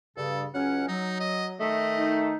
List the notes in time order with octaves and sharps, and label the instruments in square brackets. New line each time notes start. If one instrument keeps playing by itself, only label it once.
[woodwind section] G2 C#3 [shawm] A4
[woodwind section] C#2 F#3 C#4 [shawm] F#5
[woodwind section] F#3 [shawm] D#4
[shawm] D#5
[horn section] D#3 A3 [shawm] D#5
[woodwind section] D#4